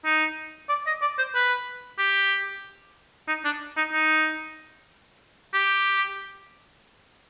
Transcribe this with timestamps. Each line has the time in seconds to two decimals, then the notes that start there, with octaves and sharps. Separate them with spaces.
0.05 D#4
0.69 D5
0.87 D#5
1.02 D5
1.18 C5
1.35 B4
1.99 G4
3.28 D#4
3.45 D4
3.77 D#4
3.93 D#4
5.54 G4